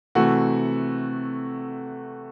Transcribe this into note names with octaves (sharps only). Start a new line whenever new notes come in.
C3 E3 A3 F#4